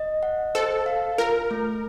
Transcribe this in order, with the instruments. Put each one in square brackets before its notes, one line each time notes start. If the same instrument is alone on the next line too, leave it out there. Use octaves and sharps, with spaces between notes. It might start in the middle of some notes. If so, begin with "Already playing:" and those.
Already playing: [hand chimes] D#5
F#5
[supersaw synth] A4 [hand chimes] C5
[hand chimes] F5
[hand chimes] F4 [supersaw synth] A#4
[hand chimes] A3